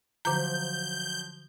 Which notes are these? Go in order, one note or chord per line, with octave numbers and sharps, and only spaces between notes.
D3 F3 F#3 C5 A#5 G6